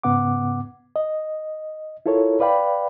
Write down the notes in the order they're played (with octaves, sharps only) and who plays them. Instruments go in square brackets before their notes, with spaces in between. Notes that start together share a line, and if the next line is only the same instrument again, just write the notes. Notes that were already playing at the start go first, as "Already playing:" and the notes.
[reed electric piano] G#2 C#3 B3 F#5 D6
D#5
E4 F4 A4 A#4 C#5
B4 D5 F5 G5 B5